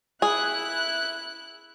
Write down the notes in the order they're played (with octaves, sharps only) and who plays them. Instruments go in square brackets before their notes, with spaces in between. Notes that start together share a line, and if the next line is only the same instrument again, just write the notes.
[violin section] E4 F#6 [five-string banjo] G#4